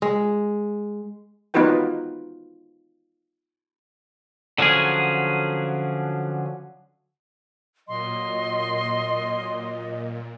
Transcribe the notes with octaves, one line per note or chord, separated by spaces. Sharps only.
G#3
B3 D#4 F4 F#4 B4 G5
D3 F3 F#3 C#4 G#4
A#2 F#3 D#5 C6